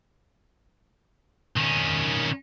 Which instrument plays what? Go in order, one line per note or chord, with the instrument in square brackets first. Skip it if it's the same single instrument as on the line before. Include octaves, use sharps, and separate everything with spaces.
[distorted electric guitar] D#3 C#4